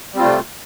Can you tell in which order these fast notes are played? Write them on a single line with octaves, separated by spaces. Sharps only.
G3 C4 F4 A3 C3